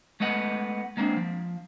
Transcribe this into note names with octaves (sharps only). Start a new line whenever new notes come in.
G#3 A3 B3 D#5 F#5
G#3 A#3 C4 D4
F3